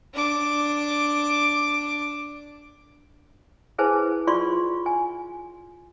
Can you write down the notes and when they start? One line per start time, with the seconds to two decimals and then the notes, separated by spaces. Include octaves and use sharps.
0.14 D4 D6
3.78 E4 G#4 B4 C5 G#5 A5
4.27 F4 D5 C6 C#6
4.86 G#5